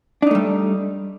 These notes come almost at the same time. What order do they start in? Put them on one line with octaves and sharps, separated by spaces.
D4 D#4 A3 G3